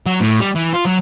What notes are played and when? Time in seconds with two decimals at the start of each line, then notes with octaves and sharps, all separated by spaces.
0.06 F#3
0.21 A2
0.40 G3
0.55 E3
0.73 F4
0.85 F#3